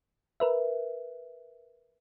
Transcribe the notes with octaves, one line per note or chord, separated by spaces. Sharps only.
A#4 B4 E5